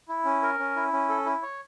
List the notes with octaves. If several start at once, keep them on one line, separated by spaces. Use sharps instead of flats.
E4
C#4
A#4
C#4
E4
C#4
A4
E4
C#5